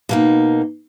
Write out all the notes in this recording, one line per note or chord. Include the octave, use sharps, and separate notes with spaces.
B2 A#3 D#4